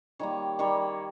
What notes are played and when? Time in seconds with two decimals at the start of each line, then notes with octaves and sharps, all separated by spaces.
0.19 D#3 G3 A#3 C#5
0.59 D#3 G3 A#3 C#5